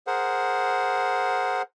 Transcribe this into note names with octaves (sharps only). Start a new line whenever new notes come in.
G#4 A#4 C5 F#5